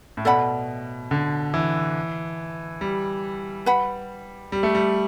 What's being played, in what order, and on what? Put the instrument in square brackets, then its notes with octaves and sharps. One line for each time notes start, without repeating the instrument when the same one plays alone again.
[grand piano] A2
[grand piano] B2 [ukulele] A4 D5 F#5 B5
[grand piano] D3
E3
G3
[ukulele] B4 F#5 B5
[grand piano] G3
A3
G3